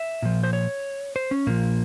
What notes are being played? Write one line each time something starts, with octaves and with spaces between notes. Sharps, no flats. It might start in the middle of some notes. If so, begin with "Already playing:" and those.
Already playing: E5
A#2 F3
C5
C#5
C5
C#4
A#2 F3 A#3